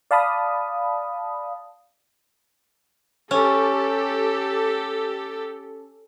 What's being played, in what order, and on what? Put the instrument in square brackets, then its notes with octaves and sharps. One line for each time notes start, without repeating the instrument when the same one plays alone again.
[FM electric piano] D5 F5 A5 B5 D#6
[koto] C#4 [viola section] G4 A4